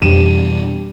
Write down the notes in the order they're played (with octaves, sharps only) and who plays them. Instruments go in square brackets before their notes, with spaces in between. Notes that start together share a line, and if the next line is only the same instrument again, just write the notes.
[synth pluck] F2 [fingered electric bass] B2 E3 D4 [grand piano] G3 D#7 E7